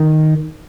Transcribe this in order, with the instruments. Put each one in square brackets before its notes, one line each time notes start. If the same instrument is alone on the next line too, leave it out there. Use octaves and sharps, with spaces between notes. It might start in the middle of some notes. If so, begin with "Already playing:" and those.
Already playing: [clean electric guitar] D#3